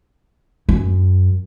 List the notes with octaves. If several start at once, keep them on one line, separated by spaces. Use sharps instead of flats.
F#2